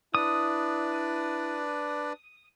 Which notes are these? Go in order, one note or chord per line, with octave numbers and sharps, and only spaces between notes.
D4 E4 B4 D5 D#6